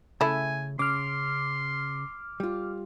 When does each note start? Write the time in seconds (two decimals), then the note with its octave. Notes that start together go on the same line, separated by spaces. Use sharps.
0.21 C#3 A3 E4 G#5
0.79 C#3 C6 D6 F6
2.40 G3 F4